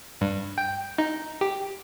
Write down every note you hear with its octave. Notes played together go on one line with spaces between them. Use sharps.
G2
G5
D#4
G4